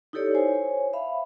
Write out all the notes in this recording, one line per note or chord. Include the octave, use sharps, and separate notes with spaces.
D#4 E4 G4 A4 C#5 D5
C5 C#5 G#5
E5 F5 B5